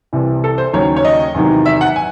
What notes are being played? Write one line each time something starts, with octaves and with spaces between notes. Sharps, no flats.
C2 C3 E3
A4
C5
D#2 C#3 F#3 C#5
C#5
D#5
E2 C3 D#3 F#3
E5
F#5
G#5